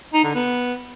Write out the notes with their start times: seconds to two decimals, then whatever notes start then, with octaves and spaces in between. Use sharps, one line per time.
0.14 D#4
0.24 D3
0.35 B3